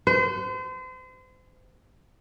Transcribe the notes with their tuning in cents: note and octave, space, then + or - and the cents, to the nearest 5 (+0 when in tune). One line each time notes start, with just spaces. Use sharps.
C5 -35